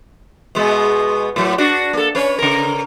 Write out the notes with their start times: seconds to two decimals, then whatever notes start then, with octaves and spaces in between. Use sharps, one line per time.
0.55 B2 G#3 B3
1.36 A2 F#3
1.58 D4 F#4
1.93 A#3 A4
2.15 C#4 B4 C#5
2.39 C#3 A#4